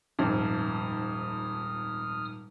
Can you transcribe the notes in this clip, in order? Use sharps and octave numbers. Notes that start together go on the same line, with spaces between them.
D#1 F2 G#2 D#4 D#6 F6